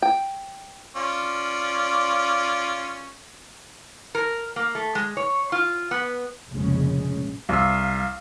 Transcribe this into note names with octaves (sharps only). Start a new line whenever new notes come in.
G5
C#4 F4 D5
A#4
A#3
A3
G#3
C#5
F4
B3
F1 A#1 C#3 G#3 C#4
C2 F5 E6